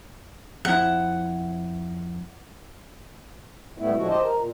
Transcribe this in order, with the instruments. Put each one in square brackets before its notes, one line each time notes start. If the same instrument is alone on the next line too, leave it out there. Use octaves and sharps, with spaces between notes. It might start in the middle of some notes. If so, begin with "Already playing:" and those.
[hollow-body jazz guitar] F2 C4 E4 [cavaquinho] F#5
[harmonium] A2 G3 A3 B3 E4
A2 D3 F3 G#3 E4 F#4
G4 C5 D#5 A5
A#4
A#2